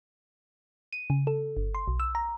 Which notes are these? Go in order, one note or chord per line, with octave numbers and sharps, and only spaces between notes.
D#7
C#3
A4
G1
C6
B1
E6
A#5